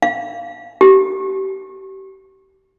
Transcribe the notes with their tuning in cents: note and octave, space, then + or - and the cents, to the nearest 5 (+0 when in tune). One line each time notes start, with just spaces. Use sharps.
F5 -10
G4 -30